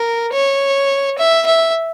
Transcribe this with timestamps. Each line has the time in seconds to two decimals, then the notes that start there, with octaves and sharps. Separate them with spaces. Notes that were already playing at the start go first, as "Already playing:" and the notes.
Already playing: A#4
0.33 C#5
1.18 E5
1.46 E5